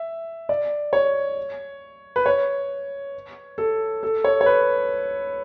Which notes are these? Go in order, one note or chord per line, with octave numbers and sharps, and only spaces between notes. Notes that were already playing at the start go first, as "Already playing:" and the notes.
Already playing: E5
D5
C#5
B4
C#5
A4
A4
C#5
C#5
B4